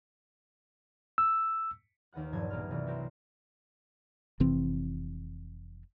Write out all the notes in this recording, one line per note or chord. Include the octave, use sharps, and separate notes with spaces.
E6
D#2 D#3 B3 F#5 F#6
A#1 G2 F3 F#3 G#6
D#1 B1 A#3 B3 F6
C2 C3 E3
E4 F#4 G4 A#4 C5
F1 C3 E3 C4